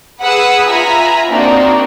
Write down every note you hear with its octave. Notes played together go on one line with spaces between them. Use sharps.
G#4 B4 F#5 B5 D#6 E6
F4 E5 G#5 A#5 B5
A#3 C4 D4 D#4 F#4